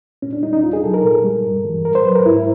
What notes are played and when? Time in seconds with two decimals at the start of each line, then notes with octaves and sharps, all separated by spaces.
0.22 A#2 C#4
0.33 D4
0.43 G3 D#4
0.53 D#4
0.63 E2 F4
0.73 G#4
0.84 B2 F#3 A4
0.94 A#4
1.04 A#2
1.24 G3
1.45 G2
1.65 E3 G3
1.85 A2 A#4
1.95 C5
2.05 F#3 B4
2.15 A#4
2.26 G#2 E4